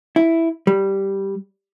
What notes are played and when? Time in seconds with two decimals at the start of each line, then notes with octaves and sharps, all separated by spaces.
0.16 E4
0.67 G3